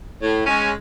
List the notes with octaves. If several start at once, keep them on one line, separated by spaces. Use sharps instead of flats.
A2
G#3 C#4